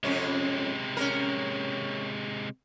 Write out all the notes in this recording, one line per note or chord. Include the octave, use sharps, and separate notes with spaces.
F2 C3 G#3 C#4
C#4 A#4